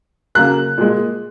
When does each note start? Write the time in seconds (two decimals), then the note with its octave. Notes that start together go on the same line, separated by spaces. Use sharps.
0.35 C#3 F#3 A#3 F#6
0.78 A#2 G#3